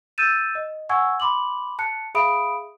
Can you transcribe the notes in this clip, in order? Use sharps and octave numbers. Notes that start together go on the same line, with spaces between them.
E6 G6 A6 D#7 E7
D#5
F#5 G#5 C#6 E6 G#6
B5 C6 D6 F#7
A5 F#6 C#7
G#4 E5 F5 B5 D#6 D7